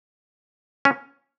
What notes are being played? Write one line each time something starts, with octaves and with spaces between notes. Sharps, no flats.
C#4